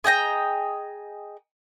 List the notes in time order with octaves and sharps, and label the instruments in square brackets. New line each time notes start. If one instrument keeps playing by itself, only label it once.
[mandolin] G#4 D#5 G5 A#5